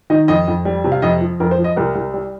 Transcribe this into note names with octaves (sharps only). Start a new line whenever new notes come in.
D#3 D#5
F2 D#5
F2
G3
C3
F5
F2 D#5
F3
F2 A#4
C5
F3
D#5
C2 A#4
C2
G3